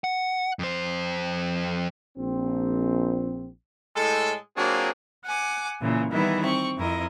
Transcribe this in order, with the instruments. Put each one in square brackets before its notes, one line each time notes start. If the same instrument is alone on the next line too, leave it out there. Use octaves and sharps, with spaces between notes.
[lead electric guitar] F#5
F2 C5
[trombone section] A#1 C4
[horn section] A2 G#3 A4
F#3 A#3 C4 D4 F4 G#4
[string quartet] F#5 G#5 D6
A#2 C#3 E3
D#3 E3 G3 B3 E4
C4 C#6
F2 E4 A#4 D#5